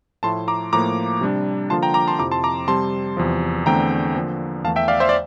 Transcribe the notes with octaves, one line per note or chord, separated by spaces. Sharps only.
A2 F3 A3 E4 A5 C6
A#5 D6
A2 F3 A#3 A#5 D6
C3 G3 D4
D3 F3 A#3 F4 A5 C6
G5 A#5
A#5 D6
A5 C6
F2 C3 F3 C4 E4 A#5 D6
A5 C6
A#5 D6
C3 G3 C4 A5 C6
E2 C3 F3
E2 D3 A3 C4 G5 A#5
D3 F3 A#3
E2 E3 A3 F5 A5
E5 G5
D5 F5
C5 E5
D5